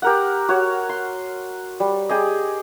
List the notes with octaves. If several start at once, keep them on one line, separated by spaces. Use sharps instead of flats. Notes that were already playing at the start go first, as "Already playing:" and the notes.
G4 A#4 F#5
F#4 C#5
C6
G3
G4 G#4 D#5